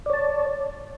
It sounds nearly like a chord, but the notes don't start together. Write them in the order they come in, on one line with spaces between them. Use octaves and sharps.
D5 C#5 A5